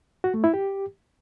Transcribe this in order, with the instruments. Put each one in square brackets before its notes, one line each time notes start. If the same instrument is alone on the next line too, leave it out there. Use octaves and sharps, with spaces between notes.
[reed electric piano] F#4
A3
E4
G4